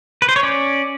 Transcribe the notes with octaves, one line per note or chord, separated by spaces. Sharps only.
B4
C5
C#5
C#4 D5